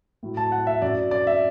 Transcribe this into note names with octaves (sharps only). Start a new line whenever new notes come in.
A2 F#3
A5
F#5
E5
F#2 F#3 D5
D5
E5